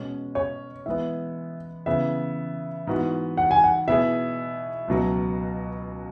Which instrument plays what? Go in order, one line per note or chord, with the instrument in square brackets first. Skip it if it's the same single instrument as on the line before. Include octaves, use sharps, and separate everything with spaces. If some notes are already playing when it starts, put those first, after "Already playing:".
Already playing: [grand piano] B2 G#3 C#4
[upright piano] C#5
[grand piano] E3 G#3 B3 [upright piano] E5
[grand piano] C#3 E3 B3 G#4 [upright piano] E5
[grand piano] G#2 E3 B3 F#4
[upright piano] F#5
G#5
F#5
[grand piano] B2 B3 E4 G#4 [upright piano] E5
[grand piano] C#2 B2 F#3